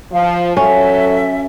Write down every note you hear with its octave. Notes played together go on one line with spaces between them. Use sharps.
F3 F5
F#3 C#4 A4 C#5 E5